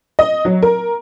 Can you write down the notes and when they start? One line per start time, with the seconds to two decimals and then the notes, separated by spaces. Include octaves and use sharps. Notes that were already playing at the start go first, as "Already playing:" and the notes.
0.19 D#5
0.45 F#3
0.63 A#4